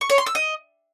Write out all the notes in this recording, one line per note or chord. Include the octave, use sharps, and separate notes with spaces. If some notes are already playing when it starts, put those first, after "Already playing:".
C#6
C#5
C6
E6
D#5